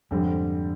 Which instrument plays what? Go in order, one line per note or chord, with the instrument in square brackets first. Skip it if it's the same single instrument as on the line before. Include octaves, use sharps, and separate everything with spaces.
[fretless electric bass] F2 G#2 [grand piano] D3 G3 C4